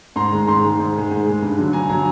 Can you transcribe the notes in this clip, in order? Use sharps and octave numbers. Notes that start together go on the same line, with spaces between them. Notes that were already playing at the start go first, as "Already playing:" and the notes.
G#2 A#5 C6
D#3 G#3
G#2 A#5 C6
D#3 G#3
G#2
D#3 G#3
G#2
D#3 G#3
G2
D3 F#3
G2 G#5 A#5
D3 F#3 G#5 A#5